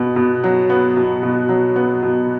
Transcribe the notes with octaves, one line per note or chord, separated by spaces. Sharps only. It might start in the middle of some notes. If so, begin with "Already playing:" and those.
Already playing: B2 B3
B2
F#3
B3
B2
B2
F#3
B3
B2